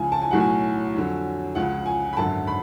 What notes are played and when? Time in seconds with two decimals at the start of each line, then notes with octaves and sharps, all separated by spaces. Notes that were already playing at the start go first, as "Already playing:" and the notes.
Already playing: C#2 C#3 F3 G#5
0.12 A5
0.22 G#5
0.31 B1 A2 F#3 F#5
0.40 G#5
0.94 F2 D3 F#3
1.55 C#2 C#3 F3 F#5
1.86 G#5
2.13 B5
2.17 G#1 F#2 D3 A5
2.47 B5